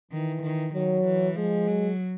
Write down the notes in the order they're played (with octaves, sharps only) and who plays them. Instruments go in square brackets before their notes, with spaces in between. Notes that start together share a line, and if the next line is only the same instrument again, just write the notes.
[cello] D#3 [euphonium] E3
[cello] D#3
[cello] D#3 [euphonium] F#3
[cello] E3
[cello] F3 [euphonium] G#3
[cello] F#3